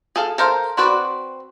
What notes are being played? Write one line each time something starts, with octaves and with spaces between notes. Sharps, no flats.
G#4 A4 F5
A4 A#4 C5 F5
C4 F#4 B4 D5